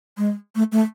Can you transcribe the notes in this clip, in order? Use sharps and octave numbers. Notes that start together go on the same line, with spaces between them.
G#3
A3
A3